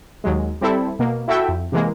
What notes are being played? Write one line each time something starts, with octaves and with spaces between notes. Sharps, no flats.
D#2 F#3 G#3
G3 C4 E4 A4
B2 A#3
E4 F#4 A4 E5 G5
F2
C3 E3 G#3 A#3